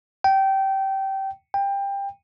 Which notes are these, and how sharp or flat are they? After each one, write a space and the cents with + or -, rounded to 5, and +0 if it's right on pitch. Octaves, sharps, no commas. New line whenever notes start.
G5 -20
G5 +20